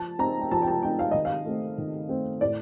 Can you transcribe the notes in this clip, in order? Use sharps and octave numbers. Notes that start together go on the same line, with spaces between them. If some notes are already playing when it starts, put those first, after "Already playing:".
Already playing: F3 A5
C4 D#4 A#5
G5
F3 A5
G5
A5
C4 D#4 G5
F5
D#3 D#5
F5
A3 C4
D#3
A3 C4
A2 D5